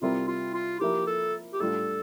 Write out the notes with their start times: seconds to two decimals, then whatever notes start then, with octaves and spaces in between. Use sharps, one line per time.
0.02 C3 G3 C4 E4 F4 A#4
0.28 F4
0.54 F4
0.80 F3 A#3 E4 G4 A#4
1.07 A4
1.53 G4
1.60 A2 G3 D4 F4 A4